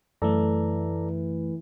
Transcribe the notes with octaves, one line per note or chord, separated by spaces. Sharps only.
F#2 E3 A3 A4 D5 A#5